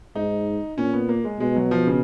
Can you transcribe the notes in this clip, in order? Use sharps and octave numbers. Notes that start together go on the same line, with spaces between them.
G#2 D#4
A#2 C#4
B3
A#3
G#3
B2 G#3
F#3
F3
C#3